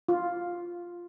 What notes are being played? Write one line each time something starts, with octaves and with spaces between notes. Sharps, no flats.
F4